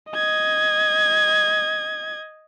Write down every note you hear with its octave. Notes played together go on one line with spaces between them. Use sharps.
D#5 G#6